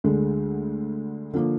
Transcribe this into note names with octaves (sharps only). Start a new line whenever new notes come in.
D2 D3 G#3
D3 F3 A#3